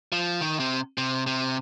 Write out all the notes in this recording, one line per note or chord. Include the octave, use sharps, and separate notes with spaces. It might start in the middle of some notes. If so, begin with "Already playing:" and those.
F3
D#3
C3
C3
C3